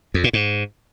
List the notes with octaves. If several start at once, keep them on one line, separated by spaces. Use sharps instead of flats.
F2
A#2
G#2